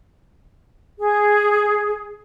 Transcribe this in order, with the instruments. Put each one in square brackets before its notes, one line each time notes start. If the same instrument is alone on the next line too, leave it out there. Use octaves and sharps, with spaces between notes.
[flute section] G#4